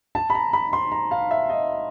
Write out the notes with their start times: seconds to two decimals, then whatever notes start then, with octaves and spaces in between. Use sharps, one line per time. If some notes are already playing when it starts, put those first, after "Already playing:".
0.15 A5
0.30 B5
0.35 A#5
0.53 B5
0.73 C6
0.92 A#5
1.11 F5
1.31 E5
1.49 D#5